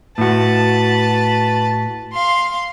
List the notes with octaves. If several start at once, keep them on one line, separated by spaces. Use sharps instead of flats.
A2 F#4 B4 A5
F5 C6